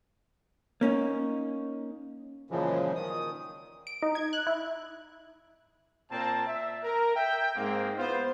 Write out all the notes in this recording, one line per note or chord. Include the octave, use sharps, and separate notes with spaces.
A#3 C#4 D#4
F#2 A#2 C#3 E3 F3 G#3
D#3 D#6
D7
D#4
G#6
F#6
E4
A#2 A#3 C4 A5
E5
A#4
E5 G5
G#2 G#3 A#3 C4
B3 E4 F4 C5